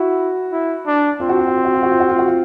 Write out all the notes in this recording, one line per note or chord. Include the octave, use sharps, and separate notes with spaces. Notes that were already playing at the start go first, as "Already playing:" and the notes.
Already playing: E4 F#4
E4
D4
C4 F4
F#4
F4
F#4
F4
F#4
F4
F#4
F4
F#4
F4
F#4
F4